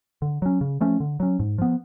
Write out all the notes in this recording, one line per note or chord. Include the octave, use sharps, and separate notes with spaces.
D3
F#3 C#4
C#3
F3 A3 C#4
D3
F#3 C#4
G#2
F3 B3